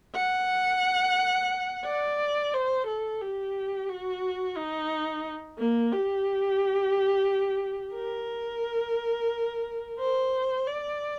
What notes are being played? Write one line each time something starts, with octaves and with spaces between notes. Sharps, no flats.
F#5
D5
C5
A4
G4
F#4
D#4
A#3
G4
A#4
C5
D5